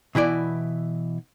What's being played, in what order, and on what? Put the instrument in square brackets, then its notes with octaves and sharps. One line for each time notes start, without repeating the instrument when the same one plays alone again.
[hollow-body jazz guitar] B2 E3 E4 D5